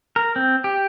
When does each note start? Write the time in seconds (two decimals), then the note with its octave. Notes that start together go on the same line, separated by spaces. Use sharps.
0.16 A#4
0.36 C4
0.64 G4